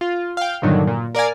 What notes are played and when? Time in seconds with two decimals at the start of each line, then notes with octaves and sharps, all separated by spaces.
0.01 F4
0.37 F5 G5
0.62 G2 A#2 D3 D#3 F#3
0.87 A#2
1.15 A#4 D5 F5 G#5